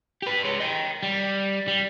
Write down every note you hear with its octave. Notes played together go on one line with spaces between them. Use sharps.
G4 B4
G#3 C#5
D#5 G5
G3
G3